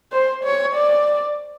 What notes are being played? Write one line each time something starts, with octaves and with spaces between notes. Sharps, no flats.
C5
C#5
D5